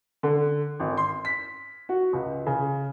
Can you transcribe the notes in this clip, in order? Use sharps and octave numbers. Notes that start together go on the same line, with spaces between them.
D3
G#1
C6
B6
F#4
C#2
C#3